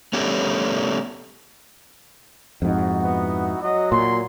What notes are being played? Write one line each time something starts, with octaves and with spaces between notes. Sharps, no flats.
A3 B3 C#4 G4 A4
F2 G#2 D#4 E4 F#4
B3
F#3 D#5
A#2 C6